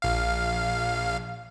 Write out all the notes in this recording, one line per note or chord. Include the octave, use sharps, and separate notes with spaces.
A#1 F5